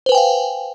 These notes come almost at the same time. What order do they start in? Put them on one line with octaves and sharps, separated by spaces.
C5 B4 G#5 G5 F5